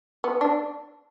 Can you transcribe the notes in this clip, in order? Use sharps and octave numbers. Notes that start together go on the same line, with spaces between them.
B3
D4